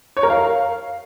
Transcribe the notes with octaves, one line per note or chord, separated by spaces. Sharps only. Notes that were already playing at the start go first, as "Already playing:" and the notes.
C#5
A#4
F5